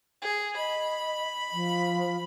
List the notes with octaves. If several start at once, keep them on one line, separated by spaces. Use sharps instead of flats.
G#4
D#5 B5
F3